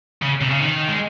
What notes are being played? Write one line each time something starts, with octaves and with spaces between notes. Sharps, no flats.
C#3
C3
C#3
D#3
G#3